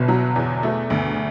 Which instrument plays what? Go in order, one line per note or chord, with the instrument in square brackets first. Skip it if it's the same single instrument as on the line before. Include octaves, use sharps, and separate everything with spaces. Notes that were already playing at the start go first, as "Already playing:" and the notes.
Already playing: [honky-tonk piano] G1 [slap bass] B2
[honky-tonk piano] F#3
E2
A3
D2